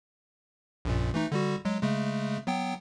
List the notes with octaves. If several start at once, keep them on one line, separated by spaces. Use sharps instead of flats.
A#1 F#2 A#2
E3 A3 D#4
D3 G3 F#4
F#3 G#3
C#3 G#3 A3
F#3 B3 G5